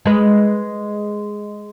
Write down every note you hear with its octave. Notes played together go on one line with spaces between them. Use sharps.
G#3 B4